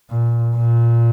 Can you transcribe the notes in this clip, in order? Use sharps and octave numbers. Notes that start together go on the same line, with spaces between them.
A#2
A#2